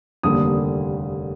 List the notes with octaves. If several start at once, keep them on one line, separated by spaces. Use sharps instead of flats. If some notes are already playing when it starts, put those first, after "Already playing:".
F1 D#2 D3 G3 A#3 D#6